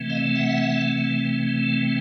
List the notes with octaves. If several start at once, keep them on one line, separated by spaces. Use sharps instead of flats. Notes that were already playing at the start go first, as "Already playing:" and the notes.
Already playing: C3 E3 A3 C4
D#5 F5
E5 F#5